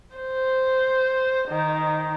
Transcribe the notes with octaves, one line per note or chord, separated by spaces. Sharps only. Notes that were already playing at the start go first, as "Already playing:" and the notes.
C5
D#3